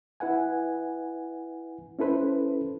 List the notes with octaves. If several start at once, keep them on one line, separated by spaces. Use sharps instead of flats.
E4 B4 F#5 G#5
C#4 E4 A4 B4 C5